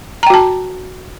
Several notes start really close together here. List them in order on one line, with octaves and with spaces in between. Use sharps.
A#5 G5 F#4 A5